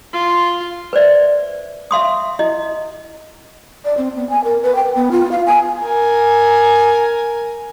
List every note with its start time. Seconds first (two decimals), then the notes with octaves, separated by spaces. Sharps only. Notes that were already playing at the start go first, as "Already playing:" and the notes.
0.13 F4
0.93 B4 C5 D5 E5
1.91 E5 F5 C6 D#6
2.39 E4 D#5
3.85 D5
3.97 C4
4.16 B3
4.30 G#5
4.44 A#4
4.63 B4
4.75 G5
4.95 B3
5.11 F4
5.31 F5
5.46 G#5
5.83 A#4 G#5